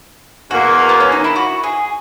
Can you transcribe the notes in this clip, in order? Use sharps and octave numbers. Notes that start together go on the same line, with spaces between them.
E2 B2 A#3 F#4
B3
C#4
D#4
E4
F#4
G#4